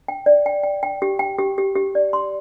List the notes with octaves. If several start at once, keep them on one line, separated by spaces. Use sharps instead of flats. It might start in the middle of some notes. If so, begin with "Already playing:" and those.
G5
D5
G5
G5
G5
G4
G5
G4
G4
G4
D5
C6